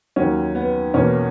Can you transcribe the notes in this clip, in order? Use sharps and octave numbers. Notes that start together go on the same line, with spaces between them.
D#2 D#3 F#3 C#4
B3
E2 B2 A#3 C#4